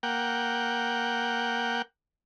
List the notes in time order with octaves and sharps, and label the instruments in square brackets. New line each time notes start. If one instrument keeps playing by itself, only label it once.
[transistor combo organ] A#3 F#5 G5